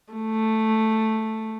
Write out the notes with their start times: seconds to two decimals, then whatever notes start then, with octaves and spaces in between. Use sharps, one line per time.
0.13 A3